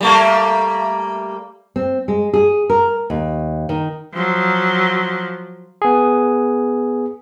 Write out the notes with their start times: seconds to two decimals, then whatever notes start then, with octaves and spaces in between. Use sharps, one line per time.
0.01 G3 A3 A#3
1.76 C4
2.08 G#3
2.33 G#4
2.70 A#4
3.10 D#2
3.69 D#3
4.14 F3 F#3
5.82 B3 G#4